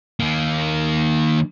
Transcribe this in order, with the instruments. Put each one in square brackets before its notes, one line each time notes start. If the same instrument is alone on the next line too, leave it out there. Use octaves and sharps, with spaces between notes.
[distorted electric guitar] D#3 A#3